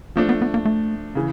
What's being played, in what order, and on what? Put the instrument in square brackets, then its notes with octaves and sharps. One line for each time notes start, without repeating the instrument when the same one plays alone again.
[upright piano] F3 A3 D4 [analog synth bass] A#3
[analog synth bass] B3
B3
A#3
A3
[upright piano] C#3 E3